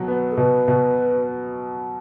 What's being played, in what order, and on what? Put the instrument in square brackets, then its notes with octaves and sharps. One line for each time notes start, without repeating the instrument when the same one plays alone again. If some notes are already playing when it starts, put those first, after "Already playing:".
Already playing: [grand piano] B2 F#3
B3
[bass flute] A4
[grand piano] B2 [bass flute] B4
[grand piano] B2